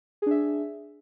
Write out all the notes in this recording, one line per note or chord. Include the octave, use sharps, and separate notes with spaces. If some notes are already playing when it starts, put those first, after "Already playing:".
D4 G#4 E5